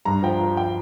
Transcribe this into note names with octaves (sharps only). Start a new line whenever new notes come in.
G2 A#5
F3 G5
F3
G5